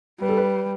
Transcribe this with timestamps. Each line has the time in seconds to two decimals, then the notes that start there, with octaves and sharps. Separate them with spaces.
0.21 G3 B4
0.29 A4
0.37 B4